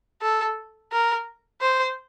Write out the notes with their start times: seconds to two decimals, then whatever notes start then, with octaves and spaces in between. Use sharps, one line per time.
0.22 A4
0.92 A#4
1.61 C5